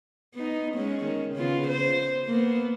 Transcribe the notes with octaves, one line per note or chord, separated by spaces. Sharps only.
B3 D#4
G#3 C#4
D#3
C#3 B3 F4
C5
A#3 B3